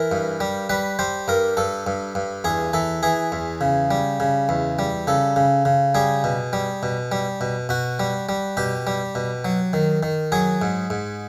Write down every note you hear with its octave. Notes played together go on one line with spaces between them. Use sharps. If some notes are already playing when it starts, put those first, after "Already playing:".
Already playing: E3 A#4
G2
G3
G3 B4
G3 C5
G2 A#4
G2 A4
G2
G2
E2 G#4
E3 A4
E3 G#4
E2
C#3
G3
C#3
E2
G3
C#3 A4
C#3
C#3
G3 G#4
B2
G3
B2
G3
B2
B2 F#4
G3
G3
B2 G4
G3
B2
F#3
D#3
D#3
F#3 G#4
G#2
G#2